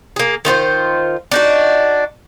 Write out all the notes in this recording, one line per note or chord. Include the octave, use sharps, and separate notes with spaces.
A#3 G#4
D#3 F4 F#4 C5
D4 D#4 F#4